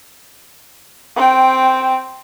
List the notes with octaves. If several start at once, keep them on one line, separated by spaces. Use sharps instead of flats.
C4 G5